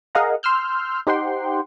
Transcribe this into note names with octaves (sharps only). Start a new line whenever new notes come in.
G#4 A#4 D#5 F5 F#5 A#5
C6 E6 F6 G6
D#4 G4 C5 F#5 G5 C6